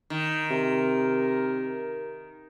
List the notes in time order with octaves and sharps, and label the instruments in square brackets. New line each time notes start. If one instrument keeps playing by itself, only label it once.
[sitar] D#3
[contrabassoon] C3 [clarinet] A#4